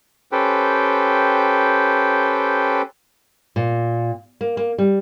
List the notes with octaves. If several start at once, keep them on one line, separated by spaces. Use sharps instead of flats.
C#4 G4 A4 B4 C5 G5
A#2
A#3
A#3
G3